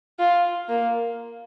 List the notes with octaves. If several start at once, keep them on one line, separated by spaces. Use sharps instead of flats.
F4
A#3